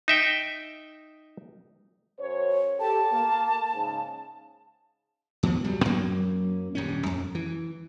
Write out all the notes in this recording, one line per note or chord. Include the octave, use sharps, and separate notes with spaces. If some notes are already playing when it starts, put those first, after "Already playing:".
D#4 E5 G5
F#2 C5 C#5
G4 A4 A5
A#3
G#2 C#3
E2 F3 B3
D1 B1 F#3 G3
F#2 F#3 A#3 C#4
D#1 G2 C#4
F2
E3